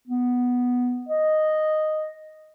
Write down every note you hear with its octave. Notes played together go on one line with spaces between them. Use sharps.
B3
D#5